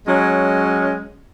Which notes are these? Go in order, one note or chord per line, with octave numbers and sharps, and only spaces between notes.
F#3 G#3 C#4